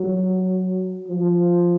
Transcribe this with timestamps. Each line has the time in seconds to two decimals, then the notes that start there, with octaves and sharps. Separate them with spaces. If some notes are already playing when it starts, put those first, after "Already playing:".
Already playing: F#3
1.08 F3